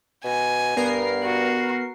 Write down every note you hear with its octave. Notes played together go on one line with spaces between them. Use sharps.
B2 G#5
G2 B3 A#4 C7
F#4